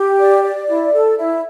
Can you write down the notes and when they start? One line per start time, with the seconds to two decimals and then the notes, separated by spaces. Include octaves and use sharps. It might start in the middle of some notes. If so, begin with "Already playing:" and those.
Already playing: G4
0.19 D5
0.43 D5
0.68 E4
0.92 A4
1.18 E4